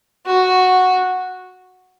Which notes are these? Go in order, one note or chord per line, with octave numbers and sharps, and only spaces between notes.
F#4